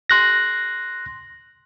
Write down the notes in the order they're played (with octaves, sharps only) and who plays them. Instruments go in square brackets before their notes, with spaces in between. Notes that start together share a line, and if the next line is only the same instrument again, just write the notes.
[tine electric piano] C6 F#6 A#6